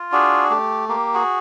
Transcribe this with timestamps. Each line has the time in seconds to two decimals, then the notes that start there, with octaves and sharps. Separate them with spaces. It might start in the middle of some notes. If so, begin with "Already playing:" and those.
Already playing: F4
0.12 D4 F#4 G#4
0.50 A3 G4
0.89 A#3 G4
1.14 F#4 G#4